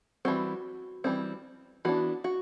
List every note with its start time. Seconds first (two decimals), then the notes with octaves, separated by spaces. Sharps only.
0.25 E3 G3 C4 F#4
1.04 E3 G3 C4
1.85 E3 B3 D4 F#4
2.24 F#4